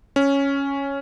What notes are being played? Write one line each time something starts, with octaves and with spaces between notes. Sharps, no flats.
C#4